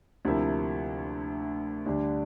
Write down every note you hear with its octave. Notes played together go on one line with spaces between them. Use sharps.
D2 C3 F3 A#3 E4
D2 D3 G3 D4